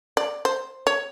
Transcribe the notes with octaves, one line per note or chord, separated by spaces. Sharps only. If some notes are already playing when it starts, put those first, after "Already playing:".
D5
C5
C#5